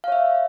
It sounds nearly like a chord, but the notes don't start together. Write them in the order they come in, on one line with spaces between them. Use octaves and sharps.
F5 C#5 E5